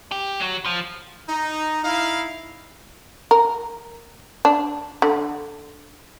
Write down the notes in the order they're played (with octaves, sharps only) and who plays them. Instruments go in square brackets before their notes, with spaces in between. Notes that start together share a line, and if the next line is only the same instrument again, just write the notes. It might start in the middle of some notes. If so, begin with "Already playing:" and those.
[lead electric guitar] G4
F#3
F3
[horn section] D#4
D#4 E4 F5
[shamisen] A#4
D4
D3